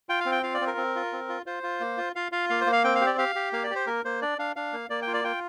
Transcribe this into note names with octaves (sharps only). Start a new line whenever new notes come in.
F4 G5
F5
C4
G5
F4 F5
D5
C4
A#4
C4
F4
C4
F4
F4 C5
F4
A#3
F4
F4 F5
F4 F5
A#3 F5
C5
A#3
F5
C4 G5
F5
G4
D5
G4 F5
G4
A#3 F5
D5
G4
C5
A#3 A#4
A#3 C5
D4 D5
D4 F5
D4 F5
A#3
A#3 D5
G5
F4
D5
F4 G5